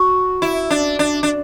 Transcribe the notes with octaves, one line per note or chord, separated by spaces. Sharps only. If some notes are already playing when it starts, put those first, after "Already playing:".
Already playing: F#4
E4
D4
D4
D4